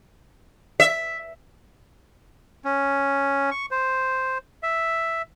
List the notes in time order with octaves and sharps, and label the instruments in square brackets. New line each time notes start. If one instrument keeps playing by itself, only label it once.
[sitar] E5
[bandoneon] C#4
C#6
C5
E5